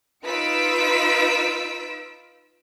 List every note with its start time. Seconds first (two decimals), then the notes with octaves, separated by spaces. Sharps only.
0.24 D#4 F4 B4 E6 B6 D7